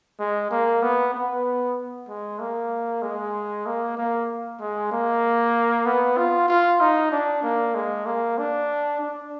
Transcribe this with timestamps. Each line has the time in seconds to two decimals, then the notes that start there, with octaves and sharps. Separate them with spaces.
0.20 G#3
0.51 A#3
0.83 B3
1.14 B3
2.09 G#3
2.40 A#3
3.03 G#3
3.66 A#3
3.98 A#3
4.60 G#3
4.92 A#3
5.86 B3
6.18 F4
6.49 F4
6.81 D#4
7.12 D4
7.43 A#3
7.75 G#3
8.06 A#3
8.38 D4
9.01 D4